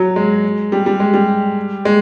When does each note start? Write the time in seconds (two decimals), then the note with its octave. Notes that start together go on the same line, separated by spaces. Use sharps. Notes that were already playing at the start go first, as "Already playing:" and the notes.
Already playing: F#3
0.16 G#3
0.72 G3
0.86 G3
1.00 G#3
1.14 G3
1.85 G#3